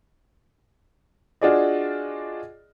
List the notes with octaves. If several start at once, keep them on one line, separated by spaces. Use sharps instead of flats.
D4 F4 F#4 G#4 D5 D#5